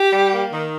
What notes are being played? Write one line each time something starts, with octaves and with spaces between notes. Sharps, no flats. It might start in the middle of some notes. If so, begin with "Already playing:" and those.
Already playing: G4
G3
A#3
D#3